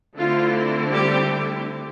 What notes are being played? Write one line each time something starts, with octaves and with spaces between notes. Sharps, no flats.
D3 A3 C4 E4 F4
G3 G4